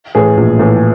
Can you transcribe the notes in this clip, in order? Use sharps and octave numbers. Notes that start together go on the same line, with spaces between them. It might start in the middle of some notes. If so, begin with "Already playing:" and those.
A2 E3 G#4
A#1
A2 E3